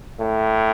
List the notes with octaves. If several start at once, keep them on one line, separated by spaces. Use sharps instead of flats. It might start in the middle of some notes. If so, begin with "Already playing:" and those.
A2